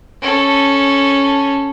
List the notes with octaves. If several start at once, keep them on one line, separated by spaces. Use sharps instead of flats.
C#4 A4